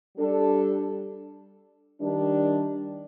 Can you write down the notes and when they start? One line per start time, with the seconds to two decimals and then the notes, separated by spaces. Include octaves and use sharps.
0.17 G3 D4 A4
2.01 D#3 G3 D4